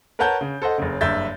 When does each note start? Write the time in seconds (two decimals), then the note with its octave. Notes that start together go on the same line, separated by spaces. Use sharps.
0.19 A#4 B4 C#5 F#5 A5 G6
0.41 C#3
0.62 A4 C5 D#5 F#5
0.78 F#1 C#3
1.01 F#1 G2 E5 G6 A6